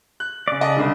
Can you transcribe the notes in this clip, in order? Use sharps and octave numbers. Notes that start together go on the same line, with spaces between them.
F#6
C#3 D5
D#5 A5
C2 D3